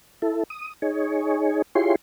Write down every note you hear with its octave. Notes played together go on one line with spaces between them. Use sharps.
E4 A4
D#6
D#4 G#4 C#5
E4 F4 G4 G#4 C#5 C6